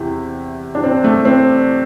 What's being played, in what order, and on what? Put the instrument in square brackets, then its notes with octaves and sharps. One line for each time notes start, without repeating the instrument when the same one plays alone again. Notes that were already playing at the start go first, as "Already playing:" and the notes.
Already playing: [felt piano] E2 C3 E3
D4
C4
A3
C4